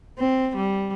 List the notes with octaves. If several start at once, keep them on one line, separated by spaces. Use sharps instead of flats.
C4
G3